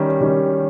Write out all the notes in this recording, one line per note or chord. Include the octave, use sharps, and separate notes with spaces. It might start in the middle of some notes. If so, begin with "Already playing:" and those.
Already playing: D#3 G3 C#4
D#3 G3 C#4